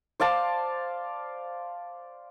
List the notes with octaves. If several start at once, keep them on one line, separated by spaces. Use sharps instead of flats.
C5 D5 F5 A5